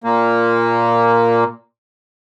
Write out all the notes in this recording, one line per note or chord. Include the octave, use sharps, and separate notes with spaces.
A#2 A#3